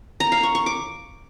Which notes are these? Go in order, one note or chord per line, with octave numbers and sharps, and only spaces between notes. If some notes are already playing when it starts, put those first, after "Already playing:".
A#5
F5
C#6
C#6
D6